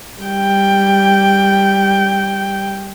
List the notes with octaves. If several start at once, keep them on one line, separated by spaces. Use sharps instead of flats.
G3 G5